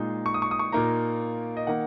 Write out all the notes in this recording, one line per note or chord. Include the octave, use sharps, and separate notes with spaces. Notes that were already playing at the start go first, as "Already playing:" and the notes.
Already playing: A#2 G#3 D#4
C#6
D#6
C#6
D#6
C#6
A#2 A#3 D#4 A#5
D#5
D#3 A#3 D#4 F#5